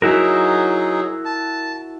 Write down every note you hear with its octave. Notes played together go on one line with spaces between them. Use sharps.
F#3 D#4 E4 F#4 G#4 A#4
A5